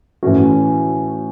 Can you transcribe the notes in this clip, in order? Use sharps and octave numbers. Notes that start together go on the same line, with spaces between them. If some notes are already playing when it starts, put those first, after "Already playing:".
A2 E3 A3 C#4 F#4